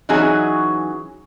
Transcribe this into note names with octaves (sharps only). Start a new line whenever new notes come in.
E3 F#3 C#4 D#4 F#4 G#4